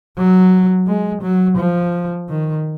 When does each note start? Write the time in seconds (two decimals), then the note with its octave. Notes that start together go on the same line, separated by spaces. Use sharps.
0.17 F#3
0.87 G#3
1.23 F#3
1.58 F3
2.29 D#3